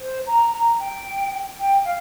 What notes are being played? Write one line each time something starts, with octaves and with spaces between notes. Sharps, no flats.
C5
A#5
A#5
G5
G5
F5